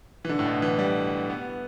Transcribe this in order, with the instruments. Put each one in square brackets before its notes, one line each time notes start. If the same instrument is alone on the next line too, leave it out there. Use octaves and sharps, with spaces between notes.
[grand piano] E3
D3
A2
B2
E3
G3
B3